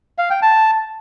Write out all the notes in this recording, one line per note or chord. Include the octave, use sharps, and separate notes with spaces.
F5
G5
A5